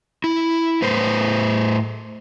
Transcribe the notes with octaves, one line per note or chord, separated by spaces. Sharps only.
E4
A2 B4 C5